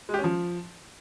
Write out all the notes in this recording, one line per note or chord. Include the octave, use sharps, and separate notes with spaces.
G#3
G4
C#4
F3